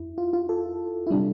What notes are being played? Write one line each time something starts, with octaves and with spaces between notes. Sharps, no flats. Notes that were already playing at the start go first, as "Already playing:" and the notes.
Already playing: F2 E4
F4
F4
A4
E4
C3 G3 D4